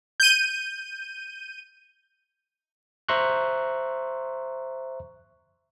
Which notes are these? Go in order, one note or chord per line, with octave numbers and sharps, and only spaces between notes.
G6 D#7
C5 E5 A#5 C6 C#6 F#6